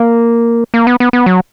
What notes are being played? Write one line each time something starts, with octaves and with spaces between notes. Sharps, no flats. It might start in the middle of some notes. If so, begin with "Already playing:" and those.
Already playing: A#3
A#3
B3
B3
B3
F#3